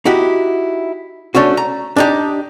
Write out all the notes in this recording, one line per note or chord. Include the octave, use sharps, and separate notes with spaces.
D#4 E4 F#4 G4
A3 C#4 D4 F#4
A#5
D4 D#4 G4